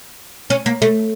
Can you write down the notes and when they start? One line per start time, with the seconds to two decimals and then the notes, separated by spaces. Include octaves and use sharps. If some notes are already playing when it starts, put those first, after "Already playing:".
0.50 C#4
0.66 A#3
0.82 A3